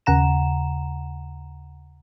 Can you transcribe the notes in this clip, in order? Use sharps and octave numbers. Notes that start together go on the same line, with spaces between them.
D#2 C#3 F#5 A#5 E7